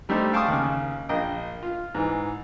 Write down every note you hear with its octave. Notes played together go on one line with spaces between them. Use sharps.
G3 A3 D#4 G4 C5
F5 G5 A5 C6 C#6 D#6
D#2 C#3
A#1 D#5 G5
F4
G#2 E3